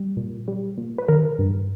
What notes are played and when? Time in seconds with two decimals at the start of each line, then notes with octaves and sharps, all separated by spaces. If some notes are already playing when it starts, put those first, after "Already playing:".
Already playing: G3
0.17 A#2
0.48 G3
0.78 A#2
0.98 B4
1.08 D#3 A#4
1.39 G2